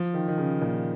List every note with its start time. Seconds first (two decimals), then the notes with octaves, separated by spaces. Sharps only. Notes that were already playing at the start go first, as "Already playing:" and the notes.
Already playing: F3
0.14 D#3
0.28 D#3
0.38 C#3
0.61 A#2